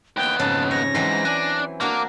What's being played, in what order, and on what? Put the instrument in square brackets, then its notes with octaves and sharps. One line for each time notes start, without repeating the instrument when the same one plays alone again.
[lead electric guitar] D#2 B3 [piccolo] G5
[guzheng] F2 G#2 C#3 [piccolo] A5
[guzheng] C#5 [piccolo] A#6
[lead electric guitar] G#2 [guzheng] E3 F#3 C4
[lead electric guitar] D4 D5 [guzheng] G#5
[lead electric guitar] A#3 [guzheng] D4 F#4 A#4 [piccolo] D6